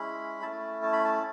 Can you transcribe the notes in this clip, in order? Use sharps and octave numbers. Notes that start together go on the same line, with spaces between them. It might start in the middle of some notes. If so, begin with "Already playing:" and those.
Already playing: G#3 C#4 E4 B5
A3 C#4 E4 A5
A5
B5
A5